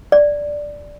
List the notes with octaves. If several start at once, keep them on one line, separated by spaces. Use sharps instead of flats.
D5